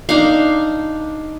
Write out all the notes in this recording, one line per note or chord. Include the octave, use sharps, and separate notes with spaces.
D4 D#4 F5